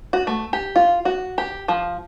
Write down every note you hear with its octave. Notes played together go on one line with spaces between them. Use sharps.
F#4
A3
G4
F4
F#4
G4
F3